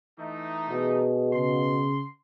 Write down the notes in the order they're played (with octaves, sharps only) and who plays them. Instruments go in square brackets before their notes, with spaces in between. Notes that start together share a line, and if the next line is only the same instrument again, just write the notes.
[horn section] E3 A3 D#4
[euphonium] B2 [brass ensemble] G#4
[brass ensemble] C#3 [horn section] C6